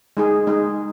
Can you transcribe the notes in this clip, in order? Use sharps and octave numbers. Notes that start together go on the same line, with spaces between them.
G#3 D#4 G#4
G#3 D#4 G#4